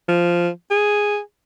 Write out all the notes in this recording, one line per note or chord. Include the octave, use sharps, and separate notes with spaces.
F3
G#4